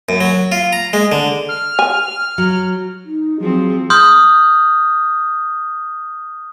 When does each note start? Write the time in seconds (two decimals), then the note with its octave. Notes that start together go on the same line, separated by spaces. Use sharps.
0.09 F#2
0.21 F#3
0.52 F4
0.73 A#5
0.93 G#3
1.12 D3
1.49 F6
1.79 G#5
2.38 F#3
3.05 D#4
3.41 F3 F#3 C4 G#4
3.90 C6 D#6 F6 G6